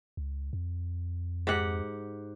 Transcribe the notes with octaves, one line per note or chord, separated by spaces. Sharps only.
C#2
F2
G#2 G4 F#5